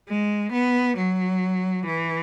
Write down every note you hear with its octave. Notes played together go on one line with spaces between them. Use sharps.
G#3
B3
F#3
E3